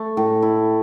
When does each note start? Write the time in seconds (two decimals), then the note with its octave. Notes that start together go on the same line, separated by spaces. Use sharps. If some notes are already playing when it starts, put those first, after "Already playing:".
Already playing: A3
0.17 A2
0.42 E4